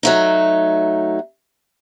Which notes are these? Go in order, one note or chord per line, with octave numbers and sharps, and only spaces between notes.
F#3 A3 D#4